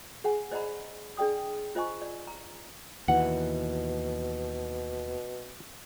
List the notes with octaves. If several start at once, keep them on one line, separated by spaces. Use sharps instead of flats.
G#4 F#5 G#5
C5 D5 D#5 F#5 A#5 B5
D4 G#4 D5 G5 D#6
F4 C5 D#5 G#5 C#6
D5
A#5
D#2 B2 E3 F#5